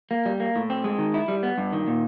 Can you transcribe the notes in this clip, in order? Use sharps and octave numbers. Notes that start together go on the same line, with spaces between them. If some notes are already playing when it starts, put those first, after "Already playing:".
A#3
G3
A#3
A2
C4
G#3
D#3
E4
G3
B3
G2
D#3
A#2